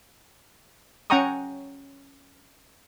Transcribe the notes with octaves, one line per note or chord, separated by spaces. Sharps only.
C#4 F#5 G5 A#5 C#6 D#6